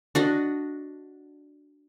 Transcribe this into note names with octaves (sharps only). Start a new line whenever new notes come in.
D4 F#4 D#5